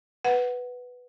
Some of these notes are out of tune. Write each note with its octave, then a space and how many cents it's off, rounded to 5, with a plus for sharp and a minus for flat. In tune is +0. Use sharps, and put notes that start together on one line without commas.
B4 +0 F#5 +0